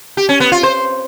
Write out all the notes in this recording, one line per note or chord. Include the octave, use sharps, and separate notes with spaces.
G4
C#4
B3
F4
C5